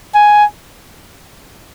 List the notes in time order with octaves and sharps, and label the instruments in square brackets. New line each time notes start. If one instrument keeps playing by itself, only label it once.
[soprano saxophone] G#5